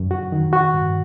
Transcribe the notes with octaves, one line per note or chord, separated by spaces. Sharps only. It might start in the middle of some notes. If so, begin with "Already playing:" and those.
Already playing: F#2
F#4
D#3
F#4
G2